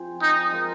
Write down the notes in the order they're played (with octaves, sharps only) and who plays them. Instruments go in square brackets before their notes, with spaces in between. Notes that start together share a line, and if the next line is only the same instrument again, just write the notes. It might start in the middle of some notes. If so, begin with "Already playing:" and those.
Already playing: [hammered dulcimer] F3 C4 G#4 C5
[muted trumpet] D#4
[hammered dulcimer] G#3 F4 A#4